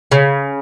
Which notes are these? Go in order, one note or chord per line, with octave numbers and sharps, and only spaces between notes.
C#3